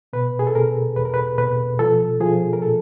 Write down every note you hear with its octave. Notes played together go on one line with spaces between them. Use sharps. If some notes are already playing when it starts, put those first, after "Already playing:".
B2 B4
G#4
A4
B2 A#4
E2 B4
A#4
B4
B2 B4
F3 A4
F3 G#4
A#4
A#2 A4